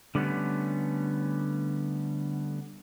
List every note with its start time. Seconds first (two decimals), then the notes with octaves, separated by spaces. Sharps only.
0.15 D3 G3 A3 B3 C#4